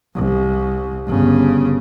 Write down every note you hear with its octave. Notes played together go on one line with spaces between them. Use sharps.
C2
G1 C#3